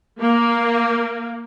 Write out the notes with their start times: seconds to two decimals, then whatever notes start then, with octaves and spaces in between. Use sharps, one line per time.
0.20 A#3